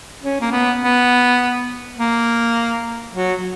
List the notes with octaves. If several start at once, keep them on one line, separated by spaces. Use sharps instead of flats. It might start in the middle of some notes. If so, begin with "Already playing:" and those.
C#4
A#3
B3
B3
A#3
F#3